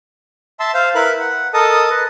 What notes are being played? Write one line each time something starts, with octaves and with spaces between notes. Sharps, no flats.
E5 A5 C6 E6
C5 F5
E4 A#4 B4 B5 F#6
F#5
A4 A#4 D#5 A5 D#6
B4 D#5